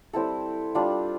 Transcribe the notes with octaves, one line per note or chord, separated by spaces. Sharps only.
G3 C4 E4 A4
G3 D4 F4